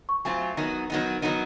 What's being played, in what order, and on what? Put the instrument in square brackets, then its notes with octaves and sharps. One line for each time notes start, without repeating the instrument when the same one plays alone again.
[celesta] C#6
[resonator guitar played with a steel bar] F#3 A3 C4 F4 [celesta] G#5
[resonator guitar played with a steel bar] D#3 F#3 B3 D#4
D#3 F#3 B3 D#4
D#3 F#3 B3 D#4